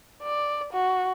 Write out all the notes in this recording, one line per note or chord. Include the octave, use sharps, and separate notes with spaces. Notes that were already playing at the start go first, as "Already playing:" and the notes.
D5
F#4